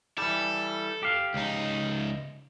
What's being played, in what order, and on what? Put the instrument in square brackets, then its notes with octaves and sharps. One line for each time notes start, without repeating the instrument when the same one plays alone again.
[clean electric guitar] E3 G3 [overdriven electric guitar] A4
[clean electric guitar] G4 F5
[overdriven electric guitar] C#2 D#4